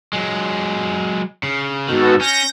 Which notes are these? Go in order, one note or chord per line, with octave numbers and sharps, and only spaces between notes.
F#3 G#3
C#3
G#2 D#3 B3 F#4 A4
C#4 G6 A#6